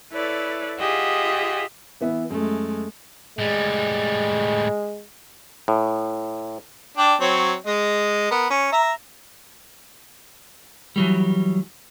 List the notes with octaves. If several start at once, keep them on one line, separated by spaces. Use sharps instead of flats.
E4 A4 B4 C#5 D5
F4 G4 G#4 D#5 E5 F#5
E3 B3 E5
F#2 G#3 A3
A2 G3 G#3
A2
D4 D5 G5
F#3 C4 C#5
G#3 D#5
B3 A#4
C#4
E5 A#5
E3 F#3 G3